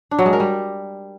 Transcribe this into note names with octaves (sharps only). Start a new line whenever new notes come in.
D4
F#3
G#3
A#4
G3